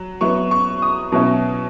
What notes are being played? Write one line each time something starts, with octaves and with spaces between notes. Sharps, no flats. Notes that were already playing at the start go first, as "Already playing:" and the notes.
Already playing: F#3
F#3 B3 E4 C#6
C#6
D#6
B2 F#3 C#4 E4